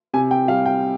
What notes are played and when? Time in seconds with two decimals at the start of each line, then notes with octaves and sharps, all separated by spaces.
0.14 C3 G#5
0.31 G5
0.48 G3 F5
0.66 G5